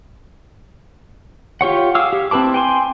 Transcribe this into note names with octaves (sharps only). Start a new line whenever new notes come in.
F4 G4 C#5 F#5
G#4 F5 D6 E6 F6
G4
C4 E4 B4 A5 D6
G5 G#5 C6